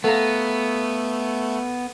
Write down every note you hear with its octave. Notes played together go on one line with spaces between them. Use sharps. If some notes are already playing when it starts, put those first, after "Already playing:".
A3 B3 A4 F5 A#5